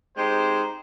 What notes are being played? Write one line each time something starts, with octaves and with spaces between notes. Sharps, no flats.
G#3 C4 D#4 G4 C5